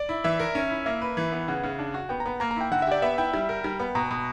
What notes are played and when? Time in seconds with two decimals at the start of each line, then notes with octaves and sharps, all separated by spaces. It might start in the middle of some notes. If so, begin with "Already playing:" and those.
Already playing: D5
0.09 E4
0.24 E3 E5
0.39 A#4
0.55 C#4
0.71 E4
0.86 A#3 E5
1.01 B4
1.17 E3
1.32 B3
1.48 C#3 F#5
1.63 C#3
1.79 D4
1.94 F#4
2.09 B3 G5
2.20 A#5
2.26 B3
2.40 A#3 A#5
2.51 A#5
2.56 E4 G5
2.71 D3 F#5
2.82 E5
2.87 G4 D5
3.02 B3 E5
3.18 E4 G5
3.34 G3
3.49 A#4
3.64 G3
3.80 B3
3.95 B2 A#5
4.11 B2